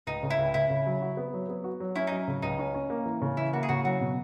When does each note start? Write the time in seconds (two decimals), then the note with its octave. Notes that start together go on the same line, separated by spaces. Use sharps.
0.07 C#2 D#4
0.23 C#3
0.30 E4
0.39 C#2
0.54 C#3 E4
0.70 C#3
0.86 F#3
1.02 F#4
1.17 B3
1.34 F#3
1.49 B3
1.64 F#4
1.80 F#3
1.95 C#4 E4
2.07 D#4
2.12 F#3
2.28 C#3
2.42 C#2 D#4
2.59 C#4
2.74 C#4
2.90 A#3
3.06 E3
3.22 C#3
3.37 E3 E4
3.53 A#3 F#4
3.63 G#4
3.69 C#3 F#4
3.84 F#3 F#4
4.00 B2